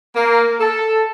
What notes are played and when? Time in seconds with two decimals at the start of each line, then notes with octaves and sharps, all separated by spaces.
0.16 A#3
0.60 A4